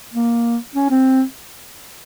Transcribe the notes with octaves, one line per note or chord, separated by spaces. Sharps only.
A#3
C#4
C4